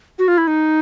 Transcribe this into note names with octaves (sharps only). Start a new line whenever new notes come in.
F#4
F4
E4
D#4